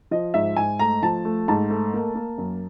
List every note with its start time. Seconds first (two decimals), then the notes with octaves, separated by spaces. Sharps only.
0.11 F3 D#5
0.34 G#2 E5
0.57 G#2 G#5
0.79 A3 A#5
1.02 F3 A5
1.25 A3
1.48 G#2 A5
1.70 A3
1.94 A#3
2.15 A#3
2.38 F#2